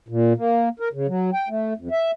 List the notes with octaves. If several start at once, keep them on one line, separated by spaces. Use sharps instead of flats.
A#2
A#3
A#4
C#3
F#3
G5
A3
F2
E5